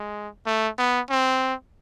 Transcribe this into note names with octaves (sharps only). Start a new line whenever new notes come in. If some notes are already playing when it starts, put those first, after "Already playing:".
Already playing: G#3
A3
B3
C4